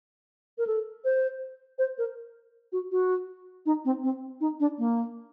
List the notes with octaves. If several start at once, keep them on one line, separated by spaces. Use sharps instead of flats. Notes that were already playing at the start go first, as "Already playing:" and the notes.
A#4
A4
C5
C5
A#4
F#4
F#4
D#4
C4
C4
D#4
D4
A#3